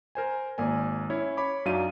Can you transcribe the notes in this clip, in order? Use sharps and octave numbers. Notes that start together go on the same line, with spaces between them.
A#4 C5 G#5
G#1 A#3 D5 G#5
C#4 E4 C#5
C#5 B5 D6
F#2 F#3 D4 D#4 F5 D#7